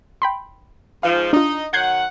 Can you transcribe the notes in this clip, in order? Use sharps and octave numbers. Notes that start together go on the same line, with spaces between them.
G5 B5 C6
G#2 F3 F5
D4 D#4 F4 D#5
D#3 F#3 F#5 G6 G#6 C7